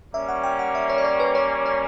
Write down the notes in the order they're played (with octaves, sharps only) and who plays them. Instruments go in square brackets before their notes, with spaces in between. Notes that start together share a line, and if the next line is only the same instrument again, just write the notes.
[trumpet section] G3 A#3 C#4 [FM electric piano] E5
[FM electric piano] F#5
G5
F#5
E5
C#5
D5
C#5
B4
C#5
C#5